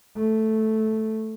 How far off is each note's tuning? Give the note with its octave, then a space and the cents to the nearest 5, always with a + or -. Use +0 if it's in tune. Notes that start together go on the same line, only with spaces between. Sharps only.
A3 -5